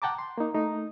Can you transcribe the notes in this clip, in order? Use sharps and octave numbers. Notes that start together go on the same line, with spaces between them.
F#5 G5 A5 A#5 D6
C6
A#3 D#4
A3 D#4